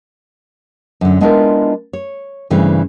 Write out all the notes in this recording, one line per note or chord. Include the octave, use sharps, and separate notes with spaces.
F#2 D3
G#3 B3 D4 E4 F4 A#4
C#5
G2 C#3 E3 A3 C4